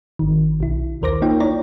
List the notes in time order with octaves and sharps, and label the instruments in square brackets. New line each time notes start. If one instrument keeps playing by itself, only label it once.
[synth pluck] G#1 D#3
B1 E4
A#1 D#2 A#4 C5 D6 A#6
A#3 D#4 F4 C#5 G5
E4 C#5 D5 A#5